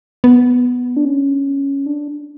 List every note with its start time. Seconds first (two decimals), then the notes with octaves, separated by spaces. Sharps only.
0.24 B3
0.97 D4
1.05 C#4
1.86 D4